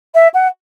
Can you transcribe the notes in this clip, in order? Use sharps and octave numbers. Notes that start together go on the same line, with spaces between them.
E5
F#5